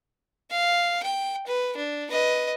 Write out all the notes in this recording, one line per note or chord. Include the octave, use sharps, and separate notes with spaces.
F5
G5
B4
D4
B4 D#5